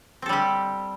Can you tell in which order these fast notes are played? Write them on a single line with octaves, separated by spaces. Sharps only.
C4 A4 G3 G4